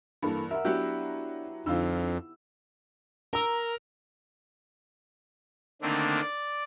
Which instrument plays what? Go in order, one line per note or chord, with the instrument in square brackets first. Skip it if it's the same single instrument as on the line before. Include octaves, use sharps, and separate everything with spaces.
[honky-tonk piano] G2 [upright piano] E3 A#3 A4
[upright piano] A#4 F#5 [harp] E5
[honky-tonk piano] F#3 F#4 [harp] B3 E4 G4 [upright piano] D4
[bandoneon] F2 [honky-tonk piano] D3 D#4 F4 [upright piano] E6
[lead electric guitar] A#4 [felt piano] A#5 E6
[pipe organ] D3 D#3 A3 A#3 C4 D4
D5